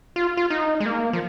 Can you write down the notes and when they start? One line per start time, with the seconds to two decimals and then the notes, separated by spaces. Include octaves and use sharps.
0.16 F4
0.37 F4
0.50 D#4
0.80 G#3
0.86 A#3
1.13 F3